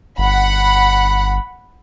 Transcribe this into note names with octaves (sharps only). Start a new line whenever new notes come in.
G1 F#5 B5